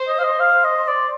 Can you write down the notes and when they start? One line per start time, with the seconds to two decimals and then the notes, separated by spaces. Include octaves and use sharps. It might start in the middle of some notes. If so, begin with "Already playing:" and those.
Already playing: C5
0.08 D#5
0.19 F5
0.24 D#5
0.40 F5
0.64 D#5
0.88 D5